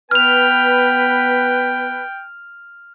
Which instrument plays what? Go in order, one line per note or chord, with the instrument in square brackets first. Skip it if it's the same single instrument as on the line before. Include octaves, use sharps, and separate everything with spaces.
[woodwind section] B3 B4 [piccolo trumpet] G5 [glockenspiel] F6 F7